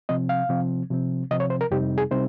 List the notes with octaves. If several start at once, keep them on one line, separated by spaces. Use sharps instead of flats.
C3 F3 C4 D#5
F5
C3 F3 C4
C3 F3 C4
C3 F3 C4 D#5
C#5
C5
A#4
F2 C3 G3 C4 D#4 G4
G#4
C3 G3 C4 D#4 C5